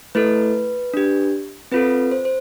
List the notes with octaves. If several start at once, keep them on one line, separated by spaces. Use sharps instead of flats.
A3 E4 A4 B4
D4 G4
C4 F4 A4 B4
C5
C5